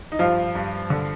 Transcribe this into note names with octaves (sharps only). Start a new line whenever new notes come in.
D#4
G2 F3 F4
G2
D3